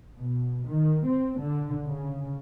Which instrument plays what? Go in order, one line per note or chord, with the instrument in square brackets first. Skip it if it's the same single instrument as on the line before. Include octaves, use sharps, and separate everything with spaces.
[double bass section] B2
D#3
C4
D3
C#3